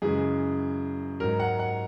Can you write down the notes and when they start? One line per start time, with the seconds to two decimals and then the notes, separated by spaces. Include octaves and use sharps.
0.02 F#2 C#3 E3 G#3 G#4
1.20 G#2 F#3 A#4
1.40 F#5
1.59 F#5